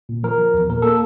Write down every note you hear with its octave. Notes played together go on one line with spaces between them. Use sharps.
A#2
F3 A#4
F3
E2
A#2 A#4
A#3 A4